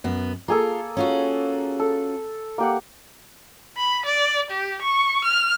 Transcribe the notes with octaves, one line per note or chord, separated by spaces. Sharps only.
F#2 B3
A#3 F4 G#4 A4
C#4 F4 F#4
A4
A#3 G4 F#5
B5
D5
G4
C#6
F6